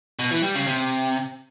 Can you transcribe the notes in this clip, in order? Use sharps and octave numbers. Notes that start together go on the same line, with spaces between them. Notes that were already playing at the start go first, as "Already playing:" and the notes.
B2
E3
G3
C#3
C3